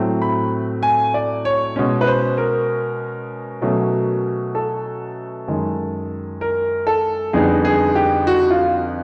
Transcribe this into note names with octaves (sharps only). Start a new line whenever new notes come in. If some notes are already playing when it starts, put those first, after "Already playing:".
Already playing: A2 F#3 A3 C4
B5
G#5
D5
C#5
B2 G#3 C#4
B4
C5
A#4
B2 F#3 A3 C#4
A4
F#2 D#3 G#3
A#4
A4
F2 D3 G3 B3 D#4 G#4
G#4
G4
F#4
F4